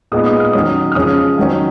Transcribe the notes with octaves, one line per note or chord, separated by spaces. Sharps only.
A#2 G#3 B3 D#4 D#6
D#6
F6
D#3 F#3 C#4 D#6
F6
C#3 F3 G#3 C#4 D#6
D#3 F#3 C#4